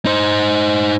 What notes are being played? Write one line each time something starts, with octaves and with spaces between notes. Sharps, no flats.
D#4 C5